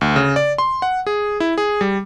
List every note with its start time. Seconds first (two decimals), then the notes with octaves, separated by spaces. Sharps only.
0.01 D2
0.16 C#3
0.36 D5
0.58 C6
0.82 F#5
1.07 G#4
1.40 E4
1.58 G#4
1.81 G3